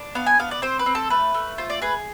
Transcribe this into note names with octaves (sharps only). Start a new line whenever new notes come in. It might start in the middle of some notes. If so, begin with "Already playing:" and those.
Already playing: D4
B3 F5
G#5
B3 F5
D5
C4 C5
B4
C4
A4
A3 B4
A3
F4 C5
D5
G#4 B4